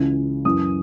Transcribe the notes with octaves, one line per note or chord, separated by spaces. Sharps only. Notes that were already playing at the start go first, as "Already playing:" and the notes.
Already playing: C#2 C#3 E3
F#2 E3 D#6